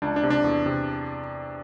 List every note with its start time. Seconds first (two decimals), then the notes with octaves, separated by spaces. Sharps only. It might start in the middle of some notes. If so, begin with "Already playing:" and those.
0.02 C#2 D4
0.16 D4
0.23 C3
0.30 D4
0.44 E2
0.66 C3